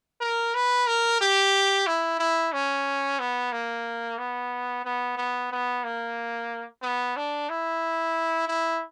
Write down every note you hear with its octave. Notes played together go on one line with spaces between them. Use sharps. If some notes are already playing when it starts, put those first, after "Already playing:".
A#4
B4
A#4
G4
E4
E4
C#4
B3
A#3
B3
B3
B3
B3
A#3
B3
D4
E4
E4